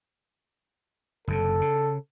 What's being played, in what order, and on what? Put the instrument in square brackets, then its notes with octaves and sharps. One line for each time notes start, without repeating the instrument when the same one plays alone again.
[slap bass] F#1 F#2 C3 [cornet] A4
[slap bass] C#3